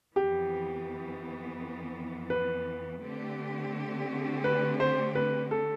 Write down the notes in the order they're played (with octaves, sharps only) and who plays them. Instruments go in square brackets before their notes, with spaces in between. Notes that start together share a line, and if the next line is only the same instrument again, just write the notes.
[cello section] F2 E3 B3 [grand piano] G4
[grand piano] B4
[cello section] D3 A3 C4 G4
[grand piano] B4
C5
B4
A4